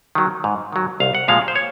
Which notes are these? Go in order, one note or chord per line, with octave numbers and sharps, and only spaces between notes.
D#3 F#3
G#2
D#3 F#3
C2 F5
F#5
A#2 F3 G#3 F5
C5
C#5